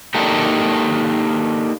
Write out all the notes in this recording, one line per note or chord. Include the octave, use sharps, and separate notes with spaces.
A#3 D4 D#4 G4 A4